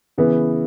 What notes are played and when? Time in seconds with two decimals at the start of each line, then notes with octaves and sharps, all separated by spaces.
0.18 C#3 E3 B3